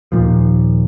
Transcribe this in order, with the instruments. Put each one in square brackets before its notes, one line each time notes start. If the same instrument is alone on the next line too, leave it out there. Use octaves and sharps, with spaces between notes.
[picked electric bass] D#2 A#2 F3